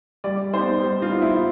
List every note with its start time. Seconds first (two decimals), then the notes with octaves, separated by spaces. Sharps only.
0.24 G3 D5
0.53 D#4 C5
0.58 B3
0.82 G3
1.02 F4
1.11 B3 D#4
1.21 E4